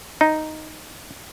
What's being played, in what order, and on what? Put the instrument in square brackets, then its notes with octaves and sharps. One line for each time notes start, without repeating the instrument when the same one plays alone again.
[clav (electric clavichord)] D#4